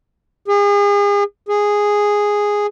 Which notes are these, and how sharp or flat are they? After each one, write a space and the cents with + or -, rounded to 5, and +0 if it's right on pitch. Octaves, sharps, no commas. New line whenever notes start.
G#4 -35
G#4 -5